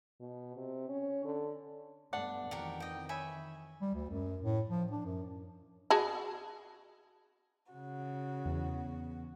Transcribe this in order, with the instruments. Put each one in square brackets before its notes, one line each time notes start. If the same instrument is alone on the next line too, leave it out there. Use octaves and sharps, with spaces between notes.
[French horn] B2
C3
C#4
D3
[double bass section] G2 A3 B3 [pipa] D4 [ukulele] F#5
[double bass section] F2 D#3 E3 [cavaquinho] F#4 G4 A#4
[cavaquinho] D#5 G5
[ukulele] C#5 [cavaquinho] E5 G#5 B5
[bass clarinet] G3
D2
F#2
A2
F3
D4
F#2
[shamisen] F#4 G#4 A5
[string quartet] C#3 F#4
[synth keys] E2